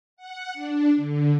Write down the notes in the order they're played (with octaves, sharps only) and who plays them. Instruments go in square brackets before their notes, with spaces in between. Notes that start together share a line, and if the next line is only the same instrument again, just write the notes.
[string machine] F#5
D4
D3